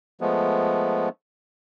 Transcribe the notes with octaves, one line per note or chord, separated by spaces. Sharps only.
F3 G#3 A3 B3